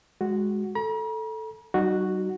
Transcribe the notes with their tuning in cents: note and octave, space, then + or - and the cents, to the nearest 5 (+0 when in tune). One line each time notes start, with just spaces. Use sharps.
G#3 +0 F#4 +0
A4 +0 A#5 +45
G3 -45 D#4 -25 F#4 +0